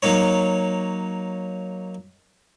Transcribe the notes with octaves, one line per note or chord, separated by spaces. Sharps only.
F#3 A#3 D#4 C#5